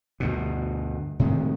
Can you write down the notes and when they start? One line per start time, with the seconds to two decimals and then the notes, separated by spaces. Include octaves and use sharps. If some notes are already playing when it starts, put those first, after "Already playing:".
0.20 D2 G2 B2
1.19 A2 C3 D#3 G#3